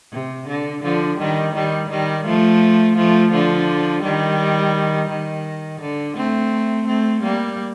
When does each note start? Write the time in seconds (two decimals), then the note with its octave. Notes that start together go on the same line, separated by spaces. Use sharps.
0.12 C3
0.48 D3
0.83 D3 F3
1.19 D#3 G3
1.55 D#3 G3
1.90 D#3 G3
2.26 F3 A3
2.97 F3 A3
3.32 D3 F3
4.03 D#3 G3
5.09 D#3
5.81 D3
6.17 A3 C4
6.87 A3 C4
7.23 G3 A#3